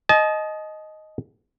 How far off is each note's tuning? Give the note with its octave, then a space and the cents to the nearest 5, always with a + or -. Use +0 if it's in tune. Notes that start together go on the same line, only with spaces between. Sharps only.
D#5 +0 A5 -40